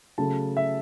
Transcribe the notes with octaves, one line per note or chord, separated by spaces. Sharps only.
C#3 F#3 A3 A5
E5